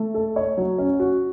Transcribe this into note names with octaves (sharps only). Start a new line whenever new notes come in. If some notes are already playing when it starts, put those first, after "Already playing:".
Already playing: A3
A4
C#5
F#3
C#4
F#4